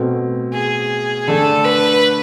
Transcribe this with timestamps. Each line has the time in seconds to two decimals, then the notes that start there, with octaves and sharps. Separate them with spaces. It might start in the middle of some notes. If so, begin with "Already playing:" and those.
Already playing: B2 A3 C4
0.53 G#4
1.28 D3 A3 D4 A4
1.65 B4